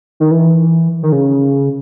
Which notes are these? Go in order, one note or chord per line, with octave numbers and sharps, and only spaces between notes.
D#3
E3
D#3
C#3